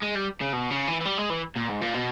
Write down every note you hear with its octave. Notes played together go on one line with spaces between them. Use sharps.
G#3
G3
C#3
B2
C#3
E3
E3
G3
G#3
E3
A#2
G#2
A#2
B2